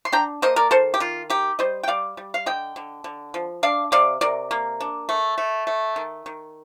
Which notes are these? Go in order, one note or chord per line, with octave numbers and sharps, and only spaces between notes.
C6
D4 G5 A#5
A#3 C5 D#5
A#4 D5
D#3 A4 C5
G4
D#3 F4
D#4 G4
G3 C5 D#5
G5
G3 D5 F5
G3
F5
D3 D#5 G5
D3
D3
F3
D4 D5 F5
C3 D5 F5
C3 A#4 D5
A#3
D4
A3
A3
A3
D#3
D#3